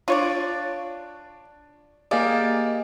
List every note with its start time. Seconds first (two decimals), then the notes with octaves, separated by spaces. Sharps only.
0.08 D4 F4 C#5 D5
2.11 A#3 G4 G#4 D5 D#5 F5 G#5